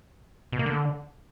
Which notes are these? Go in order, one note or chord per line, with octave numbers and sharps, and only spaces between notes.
B2
A#3
D3